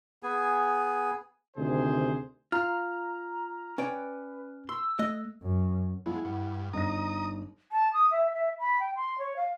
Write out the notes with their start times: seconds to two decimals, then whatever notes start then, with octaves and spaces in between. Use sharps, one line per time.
0.23 B3 G#4 G#5
1.57 D2 C3 D#3 G#4 C5
2.52 F4 A#5 F6
3.78 C#4 B4 D5 G5
4.69 C6 E6
4.99 A3 D#5
5.43 F#2
6.06 F3 G#3 B3 E4 C#5
6.25 G2 F#5
6.73 G1 D#4 A#5 D#6 A#6
7.72 A5
7.93 D#6
8.11 E5
8.34 E5
8.59 B5
8.80 G5
8.96 C6
9.18 C#5
9.36 F5